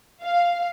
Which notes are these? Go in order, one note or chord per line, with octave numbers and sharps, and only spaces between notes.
F5